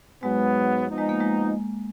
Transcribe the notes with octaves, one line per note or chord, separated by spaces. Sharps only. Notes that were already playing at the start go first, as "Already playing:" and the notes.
G#2 F#3 G#3 B3
F3 B3 D#4
G#3
A#3
G#3